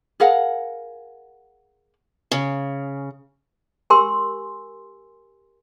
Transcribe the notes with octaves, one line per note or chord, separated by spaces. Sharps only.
G#4 A#4 F5 F#5
C#3
G4 A#4 G#5 C6 E6